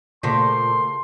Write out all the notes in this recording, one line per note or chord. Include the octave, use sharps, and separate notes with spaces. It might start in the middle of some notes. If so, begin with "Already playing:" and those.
A#2 C#3 A3 A#3 C5 C6